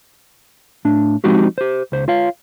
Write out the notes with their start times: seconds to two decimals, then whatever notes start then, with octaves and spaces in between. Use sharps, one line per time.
0.85 A2 D4
1.24 F3 G#3 C4 D#4 F#4 G4
1.58 G4 C5
1.92 C#2 C5
2.08 F4 C#5 F5